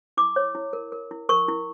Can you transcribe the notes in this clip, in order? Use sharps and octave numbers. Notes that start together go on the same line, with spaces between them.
E4 D6
C#5
E4
A#4
A#4
E4
A#4 C#6
E4